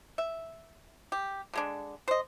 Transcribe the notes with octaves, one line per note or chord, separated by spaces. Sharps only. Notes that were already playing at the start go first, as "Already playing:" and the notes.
E5
G4
D3 G#3 D4
C5 D#5